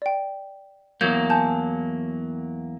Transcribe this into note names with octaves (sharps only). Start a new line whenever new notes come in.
D5 G5
E2 F#3 A#3 G6 G#6
G#5 A5 G6